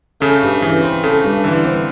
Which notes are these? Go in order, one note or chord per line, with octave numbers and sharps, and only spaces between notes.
C#3 A3
G2
C#3 E3
C4
C#3 A3
G2
D3 E3
C4